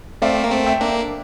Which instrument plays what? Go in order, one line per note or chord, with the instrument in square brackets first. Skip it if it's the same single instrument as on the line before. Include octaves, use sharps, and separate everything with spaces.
[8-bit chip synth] A3 C4 [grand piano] D5 F5
[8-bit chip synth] A#3
A3 C4
[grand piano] E5 G5
[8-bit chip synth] A#3 D4